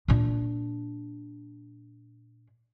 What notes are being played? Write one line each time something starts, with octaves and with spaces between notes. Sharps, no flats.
A#2 D4